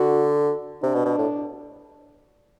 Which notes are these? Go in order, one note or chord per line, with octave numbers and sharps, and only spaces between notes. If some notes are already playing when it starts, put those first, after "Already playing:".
Already playing: D3 F#4
C3 D4
B2
B2
A2